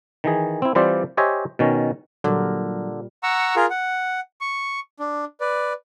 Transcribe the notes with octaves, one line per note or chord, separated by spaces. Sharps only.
D#3 E3 G#4
C4 E4
E3 G3 C4 F4 C5 D5
G4 C5 C#5 D#5 E5 G#5
B2 D#3 C#4
A#2 D3 F#3 G3 A#4
F#5 A#5 C#6 E6
F4 G#4 A#4
F#5
C#6
D4
B4 D5